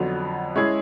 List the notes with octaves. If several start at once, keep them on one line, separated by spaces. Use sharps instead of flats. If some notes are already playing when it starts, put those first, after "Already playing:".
Already playing: F2 D3 F#3 B3
G#3 C#4 E4 G#4